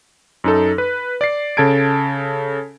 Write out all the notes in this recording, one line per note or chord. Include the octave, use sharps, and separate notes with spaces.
F#2 D#4 A4
B4
D5 A6 C7
C#3 A4 A5 G#6 D7